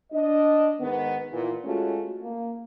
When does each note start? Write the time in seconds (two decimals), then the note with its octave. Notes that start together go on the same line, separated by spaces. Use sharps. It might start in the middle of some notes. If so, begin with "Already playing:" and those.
0.12 D4 D#5
0.80 G#2 D#3 B3
1.31 A#2 E3
1.64 G#3 A3 C#4 F4 F#4
2.22 A#3